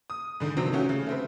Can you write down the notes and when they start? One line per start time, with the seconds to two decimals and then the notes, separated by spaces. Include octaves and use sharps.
0.10 D#6
0.40 G#2 D3
0.57 C3 D#3 F3 F#3 C4 D4
0.72 F#3 A3 C#4 F#4 G4
0.89 C#3
1.06 A3 C4 B4